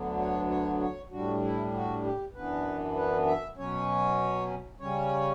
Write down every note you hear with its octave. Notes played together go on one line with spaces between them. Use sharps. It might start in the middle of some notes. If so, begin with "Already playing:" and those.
Already playing: D2 D3 F#3 B3 D4
C#5
C#5
C#5
A2 G3 D4 F#4
E4
F#4
G4
F#2 E3 B3 D4 B4
B4
E5
B2 F#3 C#4 C#5
C#3 G3 C#4 C#5